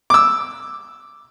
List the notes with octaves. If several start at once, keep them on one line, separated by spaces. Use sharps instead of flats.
D6 E6